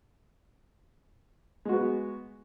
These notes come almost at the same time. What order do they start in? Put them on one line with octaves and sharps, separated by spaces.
G#3 F#4 B3